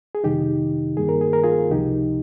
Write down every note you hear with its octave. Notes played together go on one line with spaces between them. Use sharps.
G#4
F2 C3 D#3 G3 D#4 G4
G2 D#3 G3 A#3 G#4
A#4
G#4
A#4
F4 G#4
C#2 C3 F3 D#4 G4